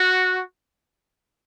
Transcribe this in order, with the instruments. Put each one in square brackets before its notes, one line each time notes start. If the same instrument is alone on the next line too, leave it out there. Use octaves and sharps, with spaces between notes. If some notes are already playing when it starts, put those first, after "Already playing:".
Already playing: [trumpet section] F#4